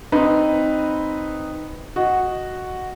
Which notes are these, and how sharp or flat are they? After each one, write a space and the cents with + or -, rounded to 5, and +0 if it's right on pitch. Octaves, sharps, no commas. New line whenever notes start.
C4 +0 D#4 -5 B4 +0
F#4 +0 D#5 +0